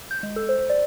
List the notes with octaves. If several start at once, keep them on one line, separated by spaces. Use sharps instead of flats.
G6
G#3
A4
C5
D5